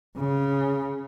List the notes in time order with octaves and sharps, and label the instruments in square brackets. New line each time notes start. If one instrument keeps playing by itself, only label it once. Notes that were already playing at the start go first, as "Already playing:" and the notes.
[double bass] C#3